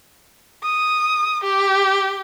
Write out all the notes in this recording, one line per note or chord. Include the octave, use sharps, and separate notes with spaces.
D#6
G4